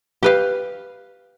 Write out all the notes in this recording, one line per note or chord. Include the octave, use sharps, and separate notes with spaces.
G4 B4 F5